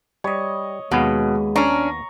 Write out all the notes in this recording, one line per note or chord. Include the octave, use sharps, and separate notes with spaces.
G3 C#5 D#5
D#2 B2 G#3 B3 F5
C#4 D4 A#5 C#6